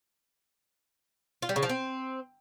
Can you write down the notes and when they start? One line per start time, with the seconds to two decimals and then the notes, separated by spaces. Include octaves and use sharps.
1.42 F4
1.49 G3
1.56 C#3
1.63 F3
1.69 C4